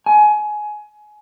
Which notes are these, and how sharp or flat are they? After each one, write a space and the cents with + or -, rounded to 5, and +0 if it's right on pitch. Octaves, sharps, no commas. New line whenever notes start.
G#5 +20